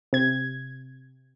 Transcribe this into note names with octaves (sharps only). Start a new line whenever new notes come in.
C3 G#6